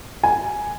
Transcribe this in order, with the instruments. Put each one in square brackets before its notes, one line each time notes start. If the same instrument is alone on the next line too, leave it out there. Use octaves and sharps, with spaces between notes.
[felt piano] G#5